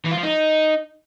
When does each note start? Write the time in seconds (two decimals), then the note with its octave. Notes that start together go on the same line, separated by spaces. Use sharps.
0.05 E3
0.11 F4
0.17 F3
0.23 D#4